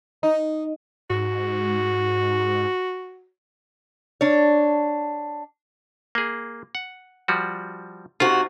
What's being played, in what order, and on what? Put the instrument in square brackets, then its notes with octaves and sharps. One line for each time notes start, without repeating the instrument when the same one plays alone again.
[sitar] D#4
[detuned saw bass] G#2 [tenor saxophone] F#4
[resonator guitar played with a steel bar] D4 C#5
[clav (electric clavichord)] A#3 G#4
F#5
F3 G3 F#4
[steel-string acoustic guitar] C3 D#4 F#4 [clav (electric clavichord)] F4